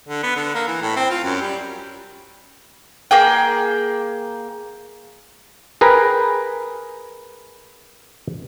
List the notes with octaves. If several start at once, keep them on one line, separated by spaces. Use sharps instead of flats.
D3
B3
D3
A#3
E3
A2
C4
F4
F#2
G3
A#3 G#4 G5
G#4 A#4 B4 G5